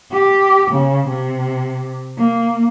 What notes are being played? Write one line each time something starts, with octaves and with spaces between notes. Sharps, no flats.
G4
C#3
C3
A#3